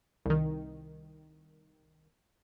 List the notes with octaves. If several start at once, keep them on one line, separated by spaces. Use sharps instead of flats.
C2 D#3